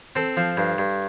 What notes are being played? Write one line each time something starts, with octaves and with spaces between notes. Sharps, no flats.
C4 A4
F3
G2
G2